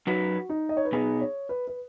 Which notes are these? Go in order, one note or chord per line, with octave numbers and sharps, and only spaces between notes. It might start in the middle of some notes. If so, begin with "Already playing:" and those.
F#2 F#3 D#4 F#4 B4
D#4
D#5
C#5
B4
B2 B3 D#4 G#4
C#5
B4
B4